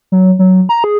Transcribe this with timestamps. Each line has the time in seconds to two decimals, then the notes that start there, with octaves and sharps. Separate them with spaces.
0.12 F#3
0.39 F#3
0.69 A#5
0.84 G#4